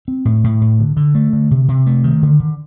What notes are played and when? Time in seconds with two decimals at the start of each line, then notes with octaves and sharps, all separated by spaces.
0.08 C4
0.25 A2
0.44 A2
0.61 A2
0.79 D3
0.97 D3
1.15 A3
1.33 D3
1.51 C3
1.68 C3
1.86 A3
2.04 D#3
2.22 D3
2.40 D3